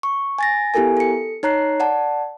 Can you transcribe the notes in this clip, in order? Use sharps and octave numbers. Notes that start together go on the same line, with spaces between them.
C#6
G#5 A6 A#6
B3 E4 G4 A4 A#4 G#5
A4 C#7
D#4 C#5 A#5 F#6 C7
D5 F#5 A5